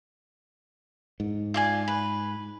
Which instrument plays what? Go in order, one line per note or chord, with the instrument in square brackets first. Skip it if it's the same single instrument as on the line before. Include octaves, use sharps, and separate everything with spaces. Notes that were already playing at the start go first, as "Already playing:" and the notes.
[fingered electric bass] G#2
[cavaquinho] F4 D5 G#5
B4